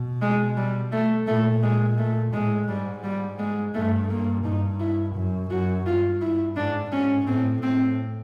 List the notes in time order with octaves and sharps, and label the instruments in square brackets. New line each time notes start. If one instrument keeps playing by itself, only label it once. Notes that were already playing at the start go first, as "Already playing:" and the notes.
Already playing: [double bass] B2
[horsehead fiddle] G#3
G3
A3
[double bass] A#2 [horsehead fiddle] A3
[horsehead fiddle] G#3
A3
[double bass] A2 [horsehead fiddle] G#3
[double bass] G#2 [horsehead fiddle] G3
[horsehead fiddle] G3
G#3
[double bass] G2 [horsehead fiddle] A3
[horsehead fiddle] A#3
[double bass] G2 [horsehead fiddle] D#4
[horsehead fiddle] E4
[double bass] F#2
[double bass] F#2 [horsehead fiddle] F#4
[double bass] G2 [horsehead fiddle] F4
[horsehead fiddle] E4
[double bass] G#2 [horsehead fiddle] D4
[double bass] G#2 [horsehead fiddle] C#4
[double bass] A2 [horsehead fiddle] C4
[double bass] A2 [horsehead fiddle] C4